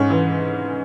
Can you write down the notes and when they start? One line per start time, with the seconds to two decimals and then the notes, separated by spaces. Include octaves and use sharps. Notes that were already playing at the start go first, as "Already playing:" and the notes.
Already playing: G#2 C#4
0.10 E3